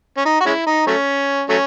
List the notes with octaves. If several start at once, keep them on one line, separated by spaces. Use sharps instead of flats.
C#4
D#4
F#4
G#3 C#4 E4
D#4
F#3 A3 C#4
F#3 A3 C#4